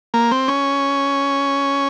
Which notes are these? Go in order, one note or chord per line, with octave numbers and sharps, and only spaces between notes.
A#3
C4
C#4